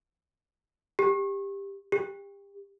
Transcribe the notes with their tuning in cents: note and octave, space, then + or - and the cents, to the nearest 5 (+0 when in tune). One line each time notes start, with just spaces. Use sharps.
G4 +15
G4 +30